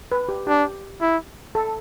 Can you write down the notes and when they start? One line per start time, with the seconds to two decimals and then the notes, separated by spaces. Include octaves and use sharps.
0.12 B4
0.29 G4
0.47 D4 G4
1.01 E4
1.55 A4